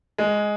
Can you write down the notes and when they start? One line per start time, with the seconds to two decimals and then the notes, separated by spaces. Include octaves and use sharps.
0.18 G#3